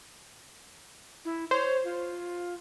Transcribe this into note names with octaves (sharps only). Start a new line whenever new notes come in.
E4
C5 C#5
F4